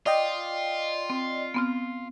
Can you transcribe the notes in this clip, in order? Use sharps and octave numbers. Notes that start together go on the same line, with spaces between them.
F4 D5 D#5 G5
C4
B3 C4 F6